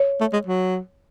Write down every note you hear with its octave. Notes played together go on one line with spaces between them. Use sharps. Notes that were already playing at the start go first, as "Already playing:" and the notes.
Already playing: C#5
A3
G#3
F#3